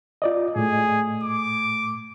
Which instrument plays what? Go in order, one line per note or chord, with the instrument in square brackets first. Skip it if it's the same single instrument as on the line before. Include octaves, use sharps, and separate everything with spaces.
[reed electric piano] F4 D5 D#5
[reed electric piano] A2 A3 [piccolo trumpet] G#4
[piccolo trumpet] D6